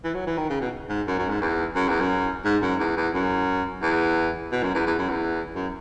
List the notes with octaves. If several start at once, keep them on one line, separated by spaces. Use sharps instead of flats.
E3
F#3
E3
D#3
C#3
B2
G#2
F#2
F#2
G#2
E2
F#2
E2
F#2
G#2
F#2
E2
E2
F#2
E2
B2
F#2
E2
E2
F#2
E2
F#2